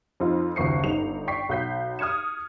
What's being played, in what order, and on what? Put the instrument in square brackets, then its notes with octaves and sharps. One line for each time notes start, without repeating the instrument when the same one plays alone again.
[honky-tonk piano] F2 D#4 F4
F#1 D#2 C#6 C7 C#7
G1 D#4 F7
D5 G5 C#6 B6 C7
B1 C#5 G6 B6 C7
D#6 F6 G#6 C#7 E7